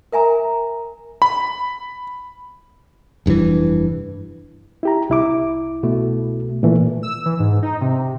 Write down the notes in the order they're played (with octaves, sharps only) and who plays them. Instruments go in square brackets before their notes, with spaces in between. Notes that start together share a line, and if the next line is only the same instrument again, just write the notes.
[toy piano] A#4 E5 G#5 A#5
[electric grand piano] B5
[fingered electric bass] F1 G2 B2 E3
[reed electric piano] E4 G4 A#5
C2 E4 D6
[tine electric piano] B2 A3
[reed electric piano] A#2 E3 A3
[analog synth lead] E6
E3
G#2
D#4
C3